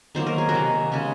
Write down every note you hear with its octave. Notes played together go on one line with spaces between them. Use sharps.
D#3 F#3 A#3 C5
A#4
G#4
F#4 A#4
C3 D#3 A#3
C#3 G#3